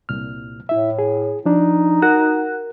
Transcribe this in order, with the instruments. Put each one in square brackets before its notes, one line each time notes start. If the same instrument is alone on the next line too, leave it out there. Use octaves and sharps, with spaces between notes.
[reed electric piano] C2 A#2 F6
[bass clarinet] A2 [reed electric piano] E4 E5
[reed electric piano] G#4
[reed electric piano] F3 D4 [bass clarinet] D#4
[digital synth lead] F#4 [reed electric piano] A#4